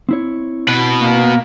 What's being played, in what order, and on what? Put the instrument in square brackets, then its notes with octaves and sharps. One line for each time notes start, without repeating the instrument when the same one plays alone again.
[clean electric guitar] C4 E4 C#5
[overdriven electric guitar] B2 B4
[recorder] A#3